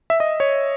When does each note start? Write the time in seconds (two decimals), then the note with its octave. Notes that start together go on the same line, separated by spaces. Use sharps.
0.10 E5
0.20 D#5
0.40 C#5